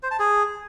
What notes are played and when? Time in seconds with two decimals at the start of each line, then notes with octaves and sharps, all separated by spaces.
0.03 C5
0.11 A5
0.19 G#4